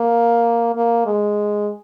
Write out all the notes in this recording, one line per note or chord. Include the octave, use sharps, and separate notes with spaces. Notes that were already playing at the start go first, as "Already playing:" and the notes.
Already playing: A#3
A#3
G#3